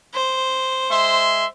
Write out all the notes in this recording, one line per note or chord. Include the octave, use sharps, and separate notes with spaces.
C5
G#3 E5 C6